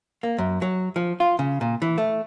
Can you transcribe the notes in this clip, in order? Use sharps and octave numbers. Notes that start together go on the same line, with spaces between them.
A#3
F#2
F#3
F3
F4
C#3
A#2
E3
A3